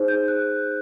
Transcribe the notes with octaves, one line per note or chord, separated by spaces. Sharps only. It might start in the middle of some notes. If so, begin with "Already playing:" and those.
Already playing: D#4 G#4 C5
G6
F#6